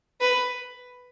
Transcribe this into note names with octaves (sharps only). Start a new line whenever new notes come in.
B4